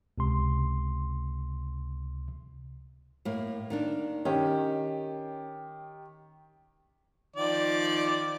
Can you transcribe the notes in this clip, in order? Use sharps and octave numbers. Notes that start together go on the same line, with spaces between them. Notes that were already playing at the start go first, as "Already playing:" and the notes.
C#2 C3 C6
A2 A#3
D#3 A#3 D4
D#3 C#4 G4
D#3 F3 D5